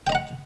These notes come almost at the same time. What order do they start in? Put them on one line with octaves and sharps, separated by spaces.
G5 D#5 A#5 F#5